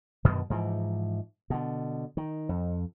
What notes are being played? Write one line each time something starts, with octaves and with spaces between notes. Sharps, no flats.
F#2 B2 D3 D#3
G#2 E3 F3
B2 D3
D#3
F2